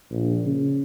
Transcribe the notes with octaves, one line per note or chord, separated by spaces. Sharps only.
A#1
C#3